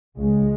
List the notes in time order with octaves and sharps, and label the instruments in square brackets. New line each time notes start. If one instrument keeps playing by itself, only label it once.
[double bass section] C#2 C#3 G#3